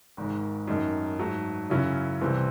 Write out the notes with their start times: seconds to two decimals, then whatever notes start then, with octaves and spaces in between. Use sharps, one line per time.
0.17 G#1 G#2 D#3 G#3
0.68 F#2 D#3 A3 D#4
1.19 G#2 F#3 A3
1.70 F#2 C#3 F#3 C#4 E4
2.21 C2 C3 E3 C4